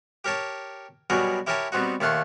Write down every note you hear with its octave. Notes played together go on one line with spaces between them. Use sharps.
G4 A#4 C#5 A5
B2 F#3 G3 G#4 A#4
E4 G4 A#4 C#5 G#5 A5
G3 B3 C4 D#4 F#4
D#2 A3 F5 F#5 C6